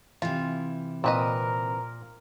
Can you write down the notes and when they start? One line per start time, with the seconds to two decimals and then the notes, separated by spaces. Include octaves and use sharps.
0.22 C3 E3 F4
1.04 A#2 C4 A#4 B4 D#5